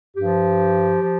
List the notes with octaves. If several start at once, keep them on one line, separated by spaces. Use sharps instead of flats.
G2 F3 G4
F3